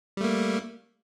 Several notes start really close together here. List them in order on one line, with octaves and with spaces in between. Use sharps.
G3 A3 A#3